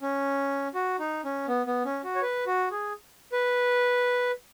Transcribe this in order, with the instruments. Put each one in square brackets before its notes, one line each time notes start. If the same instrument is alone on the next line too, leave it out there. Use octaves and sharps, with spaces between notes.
[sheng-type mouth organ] C#4
F#4
D#4
C#4
B3
B3
C#4
F#4
C#5
B4
F#4
G#4
B4